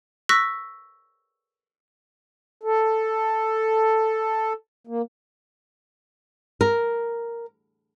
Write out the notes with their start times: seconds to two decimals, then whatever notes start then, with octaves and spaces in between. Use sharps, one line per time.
0.29 C#6 E6 F#6 A#6 B6
2.63 A4
4.87 A#3
6.61 A#4